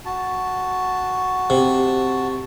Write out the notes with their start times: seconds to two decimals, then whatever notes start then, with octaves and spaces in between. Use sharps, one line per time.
0.06 F#4 A5
1.50 C3